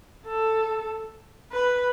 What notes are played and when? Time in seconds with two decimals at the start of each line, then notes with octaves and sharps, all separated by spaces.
0.26 A4
1.52 B4